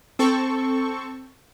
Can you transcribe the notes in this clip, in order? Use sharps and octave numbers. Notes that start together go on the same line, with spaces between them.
C4 A4 C#6